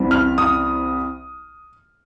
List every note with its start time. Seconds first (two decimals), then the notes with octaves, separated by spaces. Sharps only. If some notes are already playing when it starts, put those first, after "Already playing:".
Already playing: C2 C3 E3 G3
0.11 F6
0.38 D#6